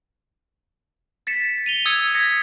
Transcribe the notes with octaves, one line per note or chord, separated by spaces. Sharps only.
A6 B6 C#7 E7
D#7 F7 G7
D#6 E6 G#6 C#7
D#6 G#6 A#6 B6 C#7